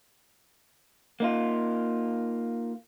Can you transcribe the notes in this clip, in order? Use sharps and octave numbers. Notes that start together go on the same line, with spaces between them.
A#3 D#4 F4